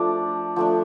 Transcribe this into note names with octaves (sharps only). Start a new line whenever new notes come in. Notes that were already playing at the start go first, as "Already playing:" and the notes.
Already playing: F3 A3 D4 D6
F3 A3 D4